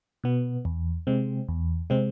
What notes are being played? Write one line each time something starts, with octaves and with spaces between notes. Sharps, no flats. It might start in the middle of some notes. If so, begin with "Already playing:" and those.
B2 B3
E2
C3 G#3 C4
E2
C3 G#3 C4